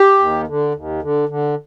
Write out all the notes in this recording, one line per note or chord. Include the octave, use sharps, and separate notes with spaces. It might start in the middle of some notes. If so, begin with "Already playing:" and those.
Already playing: G4
D#2
D3
D#2
D3
D3